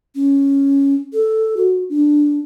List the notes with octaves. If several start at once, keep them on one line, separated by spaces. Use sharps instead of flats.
C#4
A4
F#4
D4